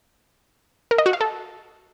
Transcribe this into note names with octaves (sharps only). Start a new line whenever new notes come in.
A#4
D#5
F#4
F5
A4